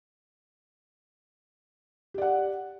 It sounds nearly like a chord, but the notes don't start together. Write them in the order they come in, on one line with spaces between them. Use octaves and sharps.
G4 D5 F#5